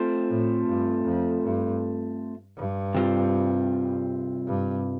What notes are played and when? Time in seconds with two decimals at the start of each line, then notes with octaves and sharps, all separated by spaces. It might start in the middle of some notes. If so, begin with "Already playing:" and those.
Already playing: A3 C4 F4 C5
0.28 A2
0.66 G2
1.05 F2
1.42 G2
2.57 G2
2.94 C3 G3 C4 F4
4.47 G2